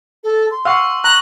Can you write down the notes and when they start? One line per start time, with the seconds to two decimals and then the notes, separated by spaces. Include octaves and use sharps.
0.24 A4
0.51 C6
0.65 F5 F#5 C#6 E6
1.04 A#5 F#6